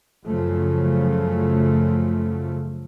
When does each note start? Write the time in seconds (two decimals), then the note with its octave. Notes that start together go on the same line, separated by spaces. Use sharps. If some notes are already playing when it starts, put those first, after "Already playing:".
0.24 F#2 C#3 F3 A3